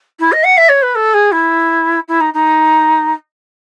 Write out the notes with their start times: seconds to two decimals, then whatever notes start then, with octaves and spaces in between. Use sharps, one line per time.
0.19 E4
0.32 D#5
0.44 F#5
0.57 E5
0.68 C#5
0.82 B4
0.95 A4
1.14 G#4
1.31 E4
2.08 E4
2.20 D#4
2.33 D#4